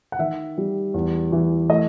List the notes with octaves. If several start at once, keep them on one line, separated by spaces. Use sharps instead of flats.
F#5
D#3 E5
G3
E2
E3
A3 D#5